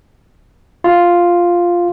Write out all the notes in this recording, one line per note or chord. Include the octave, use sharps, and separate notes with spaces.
F4